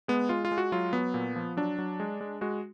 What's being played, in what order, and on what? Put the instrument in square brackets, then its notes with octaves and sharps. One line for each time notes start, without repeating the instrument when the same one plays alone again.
[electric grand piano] G#3 B3
G#3 F4
F4
G#3
F#4
F#3 F4
F#3 B3
A#2
F3
F#3 D4
F#3
G#3
G#3
G#3 F#4